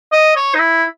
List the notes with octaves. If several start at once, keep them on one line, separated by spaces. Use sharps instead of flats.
D#5
C#5
D#4
E4